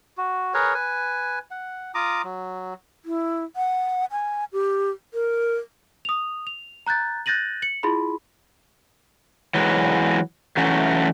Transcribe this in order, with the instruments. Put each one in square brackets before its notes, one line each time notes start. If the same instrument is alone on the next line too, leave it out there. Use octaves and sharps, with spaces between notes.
[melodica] F#4
G#4 A#4 B4 C#5
B4 G#5
F#5
F4 A#5 D6 D#6
F#3
[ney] E4
F#5
G#5
G4
A#4
[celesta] D#6 F7
F7
A#5 F#6 G6 A6
F#6 G6 A6 A#6 D#7 F#7
C#7 F#7
E4 F4 G#4 B5 C6
[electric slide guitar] E3 F#3 G#3
E3 F#3 A3 C#4